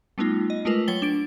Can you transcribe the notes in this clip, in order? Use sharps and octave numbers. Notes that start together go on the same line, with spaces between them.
G3 A3 B3 D#4 F4
D#5
G#3 A3 F4 A#4 B4
F#3 C#5 G5 A6 G7
D4 D7